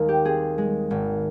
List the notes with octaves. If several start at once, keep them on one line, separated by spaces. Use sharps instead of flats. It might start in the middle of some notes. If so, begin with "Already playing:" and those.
Already playing: D#2 G#3 A#4
G4
C4 G#4
G#3
G#1